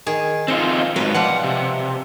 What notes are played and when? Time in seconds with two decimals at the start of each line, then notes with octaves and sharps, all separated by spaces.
0.06 D#3 G#4
0.48 C4 D#4 F4 C5
0.96 G#2 F#3 B4
1.14 B2 F3 G3 F#5
1.44 C3